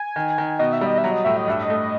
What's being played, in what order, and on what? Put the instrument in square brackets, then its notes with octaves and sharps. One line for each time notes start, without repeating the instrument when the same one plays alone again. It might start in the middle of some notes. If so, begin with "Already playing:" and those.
Already playing: [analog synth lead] G#5
[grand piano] D#3
D#3
[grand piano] B2 [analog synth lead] D#5
[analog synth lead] E5
[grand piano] G3 [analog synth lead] D#5
[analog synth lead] E5
[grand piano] F#3
[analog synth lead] D#5
[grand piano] A2 [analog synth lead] E5
[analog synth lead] D#5
[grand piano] G2 [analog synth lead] E5
[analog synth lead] D#5
[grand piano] A3